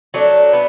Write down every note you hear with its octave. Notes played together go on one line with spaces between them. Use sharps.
F#3 A3 D4
B3